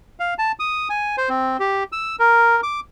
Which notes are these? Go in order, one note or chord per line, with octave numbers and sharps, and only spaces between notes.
F5
A5
D#6
G#5
C5
C4
G4
E6
A#4
D6